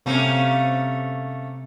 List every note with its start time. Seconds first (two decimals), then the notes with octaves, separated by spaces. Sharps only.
0.06 C3 A3 A#3 C4 C#4